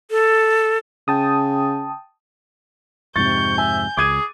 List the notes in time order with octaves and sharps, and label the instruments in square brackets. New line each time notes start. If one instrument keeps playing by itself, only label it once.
[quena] A4
[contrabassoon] C#3 [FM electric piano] G5 A5 D#6
[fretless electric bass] F2 G#2 C3 [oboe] C#6 [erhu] G6 [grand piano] A6
[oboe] E5 [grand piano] G#5
[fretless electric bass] C#2 [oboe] G#4 [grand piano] D6 G#6 D#7